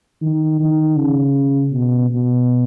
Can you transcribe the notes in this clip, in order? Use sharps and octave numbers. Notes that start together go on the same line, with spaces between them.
D#3
D#3
C#3
B2
B2